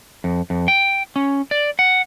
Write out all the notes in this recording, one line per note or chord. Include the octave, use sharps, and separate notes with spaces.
F2
F2
G5
C#4
D5
F#5